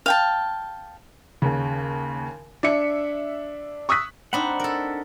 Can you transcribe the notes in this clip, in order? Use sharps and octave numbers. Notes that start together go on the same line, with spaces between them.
F5 G5 A5
D#2 C#3
D4 E5 C#7
C#6 D#6 E6 F#6 B6
C4 D4 D#4 F#5 B5
A4 A#4